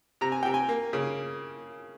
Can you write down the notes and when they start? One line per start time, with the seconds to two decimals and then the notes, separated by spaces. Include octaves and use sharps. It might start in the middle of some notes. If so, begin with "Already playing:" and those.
0.21 C3 A#5
0.32 G#5
0.43 C3 G5
0.54 G#5
0.69 A#3
0.93 C#3